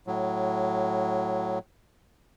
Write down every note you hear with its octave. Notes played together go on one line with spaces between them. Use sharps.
A2 F#3